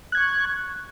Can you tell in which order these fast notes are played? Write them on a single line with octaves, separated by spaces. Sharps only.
F#6 G#6 C#6